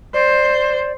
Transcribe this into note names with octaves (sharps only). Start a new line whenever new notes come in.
C5 D5